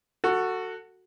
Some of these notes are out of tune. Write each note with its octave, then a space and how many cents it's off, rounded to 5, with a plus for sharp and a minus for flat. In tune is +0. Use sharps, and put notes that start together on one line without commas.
F#4 +0 A4 +25